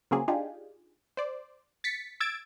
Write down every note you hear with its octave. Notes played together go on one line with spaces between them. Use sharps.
C#3 F#3 A#3 C4 C#4 G#4
D4 D#4 F4 G4 G#4
C5 D5
A6 B6 C#7
E6 G#6 A6 D7